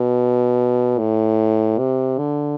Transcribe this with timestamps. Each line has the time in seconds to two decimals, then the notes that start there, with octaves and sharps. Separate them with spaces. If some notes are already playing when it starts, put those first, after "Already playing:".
Already playing: B2
0.99 A2
1.79 C3
2.18 D3